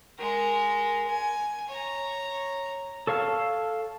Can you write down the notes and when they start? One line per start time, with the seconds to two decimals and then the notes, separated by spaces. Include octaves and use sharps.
0.18 G#3 A#4
1.07 G#5
1.69 C#5 A#5
3.07 A4 C#5 F5 A5 F6